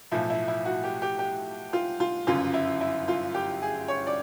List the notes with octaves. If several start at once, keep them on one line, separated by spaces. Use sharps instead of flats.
B1 A2 F3 E4
E4
E4
F#4
G4
G4
G4
F4
F4
G1 F#2 C#3 F4
E4
E4
F4
G4
G#4
C#5
D5